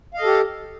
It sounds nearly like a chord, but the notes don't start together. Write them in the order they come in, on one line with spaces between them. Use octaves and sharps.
F5 D#5 A4 G4